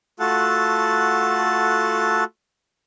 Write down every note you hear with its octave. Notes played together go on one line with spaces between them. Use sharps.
A3 F4 F#4 A4 F#5 A5